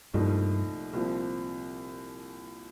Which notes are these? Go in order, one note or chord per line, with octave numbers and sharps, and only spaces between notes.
C2 G2 A#2 F3 A3 D#4
C2 A#2 F3 C4